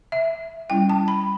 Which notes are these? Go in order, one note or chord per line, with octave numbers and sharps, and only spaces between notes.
E5
G3 C#4 E4 G5
A5
B5